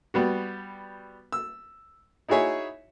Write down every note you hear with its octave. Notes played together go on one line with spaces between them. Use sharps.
G3 B3 F#4
E6
D#4 E4 F#4 G#4 C#5 E5